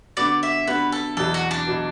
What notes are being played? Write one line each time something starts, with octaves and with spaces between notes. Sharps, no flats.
D3 B3 F#4 D5
E5
D3 B3 F#4 B4
A4
E2 B2 F#3 A4
F#4
D4
B2 F#3